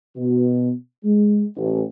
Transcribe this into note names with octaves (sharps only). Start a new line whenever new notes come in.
B2
G#3
A1